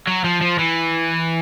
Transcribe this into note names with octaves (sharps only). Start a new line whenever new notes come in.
F#3
F3
F3
E3